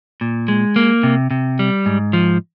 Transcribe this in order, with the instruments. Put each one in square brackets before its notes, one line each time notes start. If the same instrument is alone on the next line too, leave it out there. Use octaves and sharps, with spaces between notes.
[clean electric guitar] A#2
G#3
A#3
C3
C3
G3
G#2
F3